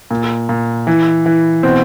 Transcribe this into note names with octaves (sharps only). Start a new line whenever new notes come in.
A#2
A#2
E3
E3
B2 C4